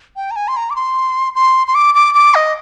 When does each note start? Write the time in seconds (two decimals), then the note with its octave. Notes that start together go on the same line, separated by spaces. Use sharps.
0.16 G5
0.31 A#5
0.36 G#5
0.48 C6
0.57 A#5
0.70 D6
0.76 C6
1.35 C6
1.67 C6
1.75 D6
1.95 D6
2.15 D6
2.35 D#5